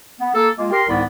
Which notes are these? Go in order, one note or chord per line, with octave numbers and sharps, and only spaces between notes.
B3
A#3 A4
G#3 A#3 F4
G4 A#4 C6
C2 G#2 D#3 B3 D5 B5